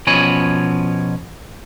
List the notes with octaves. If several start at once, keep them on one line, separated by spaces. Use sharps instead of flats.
B2 F3 C#4 C#5 G#5 B5